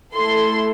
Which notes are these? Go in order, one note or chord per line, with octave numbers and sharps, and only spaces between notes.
A3 E4 A4 C6